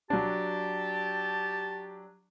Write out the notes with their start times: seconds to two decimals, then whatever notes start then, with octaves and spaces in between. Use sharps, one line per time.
0.10 F#3 D4 G4 A5